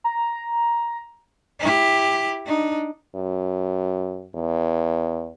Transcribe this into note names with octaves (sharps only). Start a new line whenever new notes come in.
A#5
E4 G4
D4 D#4
F#2
E2